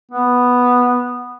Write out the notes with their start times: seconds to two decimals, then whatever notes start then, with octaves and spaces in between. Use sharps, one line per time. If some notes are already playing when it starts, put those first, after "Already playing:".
0.12 B3